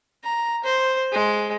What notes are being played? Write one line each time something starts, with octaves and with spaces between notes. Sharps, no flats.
A#5
C5
G#3